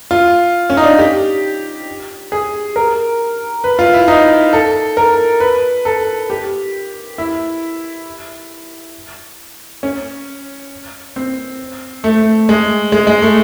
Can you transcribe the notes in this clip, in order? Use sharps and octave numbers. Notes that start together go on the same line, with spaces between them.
F4
C#4
D#4
D4
G4
G#4
A#4
B4
F4
E4
D#4
A4
A#4
B4
A4
G4
E4
C#4
C4
A3
G#3
G#3
G#3
A3